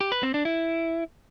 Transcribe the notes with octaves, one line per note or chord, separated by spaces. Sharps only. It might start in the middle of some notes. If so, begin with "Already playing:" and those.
G4
B4
C4
D4
E4